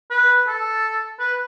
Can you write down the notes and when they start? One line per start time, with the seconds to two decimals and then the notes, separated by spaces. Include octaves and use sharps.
0.10 B4
0.47 A4
1.19 B4